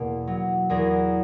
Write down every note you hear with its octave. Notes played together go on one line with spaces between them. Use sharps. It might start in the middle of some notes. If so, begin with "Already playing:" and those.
Already playing: E2 B2 A#3
F#3
E2 G#4 A#4